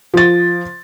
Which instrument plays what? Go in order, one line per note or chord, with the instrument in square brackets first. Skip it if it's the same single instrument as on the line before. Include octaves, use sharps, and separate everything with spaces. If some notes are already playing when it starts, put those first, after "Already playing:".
[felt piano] F3 A6